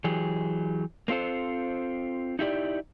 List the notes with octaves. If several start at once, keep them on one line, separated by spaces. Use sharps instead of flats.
E3 F#3 G4 G#4
A#3 C4 F4 A4 C5
D#4 E4 G4 D5